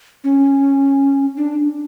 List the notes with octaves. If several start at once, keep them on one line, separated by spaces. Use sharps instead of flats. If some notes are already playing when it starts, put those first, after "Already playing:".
C#4
D4